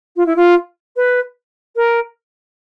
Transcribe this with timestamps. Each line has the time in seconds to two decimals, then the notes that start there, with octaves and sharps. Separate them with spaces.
0.16 F4
0.26 E4
0.36 F4
0.96 B4
1.76 A#4